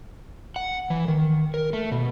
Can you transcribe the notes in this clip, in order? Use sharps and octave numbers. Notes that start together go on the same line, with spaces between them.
F#5
E3
D#3
A#4
A3
B2